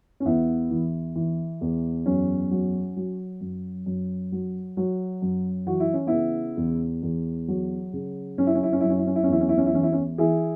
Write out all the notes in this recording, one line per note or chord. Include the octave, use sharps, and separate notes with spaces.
C#4
E2 B3 E4
E3
E3
E2
F#2 C#4
F#3
F#3
F#2
F#2
F#3
F#3
F#2
E3 F#4
E4
C#4
C#3 B3 E4
E2
E2
F#3
C#3
F#2 C#4
E4
C#4
E4
C#4
F#2 E4
C#4
E4
C#4
E4
C#4
E2 E4
C#4
E4
C#4
E4
E3 C#4
E4
C#4
E3 E4 G#4